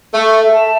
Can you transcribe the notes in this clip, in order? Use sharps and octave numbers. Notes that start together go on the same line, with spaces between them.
A3 A4
E5
A5